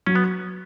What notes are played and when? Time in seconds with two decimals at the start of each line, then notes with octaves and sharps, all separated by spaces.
0.07 F#3 C#4
0.15 B3